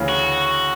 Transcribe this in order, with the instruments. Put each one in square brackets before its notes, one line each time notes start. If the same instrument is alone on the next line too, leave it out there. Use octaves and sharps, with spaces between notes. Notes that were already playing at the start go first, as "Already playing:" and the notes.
Already playing: [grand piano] D2 C#3 E3
[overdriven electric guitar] F#4